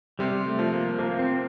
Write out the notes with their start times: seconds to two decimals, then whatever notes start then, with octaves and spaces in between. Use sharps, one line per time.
0.19 C3 G3
0.46 A3
0.59 F3
0.73 A#3
0.99 F3 A#3
1.19 C4